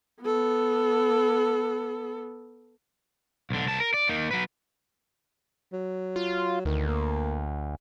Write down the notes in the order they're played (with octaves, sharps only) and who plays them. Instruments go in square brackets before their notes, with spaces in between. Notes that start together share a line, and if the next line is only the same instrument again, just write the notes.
[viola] B3 A4
[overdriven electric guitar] B1 D3
C2 A5
A#4
D5
A#3 D#4
F#3 B4
[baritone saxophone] F#3
[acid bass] F4
[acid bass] D2 [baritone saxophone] D#3
[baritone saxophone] A#3